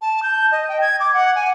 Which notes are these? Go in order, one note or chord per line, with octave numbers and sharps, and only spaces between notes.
A5
G6
D#5
G5
G#6
D6
F#5
G#5